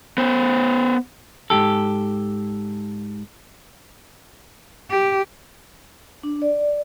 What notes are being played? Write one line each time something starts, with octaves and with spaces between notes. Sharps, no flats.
B3 C5
G#2 C3 G4 A4
G4
D4
D5